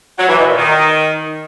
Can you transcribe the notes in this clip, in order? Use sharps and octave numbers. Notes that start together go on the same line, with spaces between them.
F#3
E3
B2
A#2
D#3